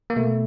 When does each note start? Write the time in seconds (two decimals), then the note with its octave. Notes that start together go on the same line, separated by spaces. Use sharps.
0.10 A#3
0.16 B2 A3